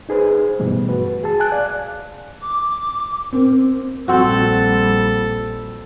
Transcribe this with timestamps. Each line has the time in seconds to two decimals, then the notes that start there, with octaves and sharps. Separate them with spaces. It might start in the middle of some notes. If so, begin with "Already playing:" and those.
0.09 D#4 G#4 B4 C5
0.59 G2 B2 E3 G3 A3
0.89 F#4 B4
1.24 G#4 A5
1.40 G#5 A5 F#6
1.52 D5 F5
2.41 D6
3.33 C4 A#4
4.08 A#1 G3 C4 F#4 A4